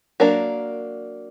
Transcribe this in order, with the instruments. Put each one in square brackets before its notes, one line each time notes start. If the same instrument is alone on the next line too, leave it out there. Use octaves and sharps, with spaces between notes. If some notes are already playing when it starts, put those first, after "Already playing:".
[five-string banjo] F#3 A#3 D4 A#4